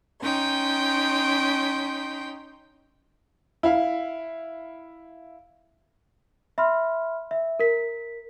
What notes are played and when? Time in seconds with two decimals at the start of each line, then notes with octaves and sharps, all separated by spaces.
0.22 C#4 D#4 G5 C6
3.63 E4 F5
6.58 E5 B5 C6 F6
7.31 E5
7.59 A#4 B6